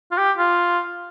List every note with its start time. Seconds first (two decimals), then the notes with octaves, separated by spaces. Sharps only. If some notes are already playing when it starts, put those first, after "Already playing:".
0.12 F4
0.18 G4
0.38 F4